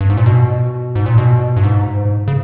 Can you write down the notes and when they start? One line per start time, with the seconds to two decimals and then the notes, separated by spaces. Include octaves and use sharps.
0.01 G2
0.10 G#2
0.17 A#2
0.26 B2
0.95 G#2
1.06 A#2
1.18 B2
1.57 G2
1.64 G#2
2.28 C#3